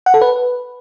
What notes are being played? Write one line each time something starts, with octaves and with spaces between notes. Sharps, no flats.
F#5
A4
B4